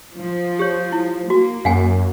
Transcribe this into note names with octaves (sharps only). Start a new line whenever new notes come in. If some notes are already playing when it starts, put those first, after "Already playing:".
F3
G4 C#5
E4
A#3 F#4
F#2 F5 F#5 G#5